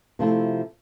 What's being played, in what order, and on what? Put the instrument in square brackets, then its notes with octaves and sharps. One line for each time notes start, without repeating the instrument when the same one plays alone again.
[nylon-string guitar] C3 F3 A3 E4